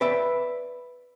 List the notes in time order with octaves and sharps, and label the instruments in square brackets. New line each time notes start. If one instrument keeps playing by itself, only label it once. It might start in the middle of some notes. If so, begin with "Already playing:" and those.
[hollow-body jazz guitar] B4 D5 E5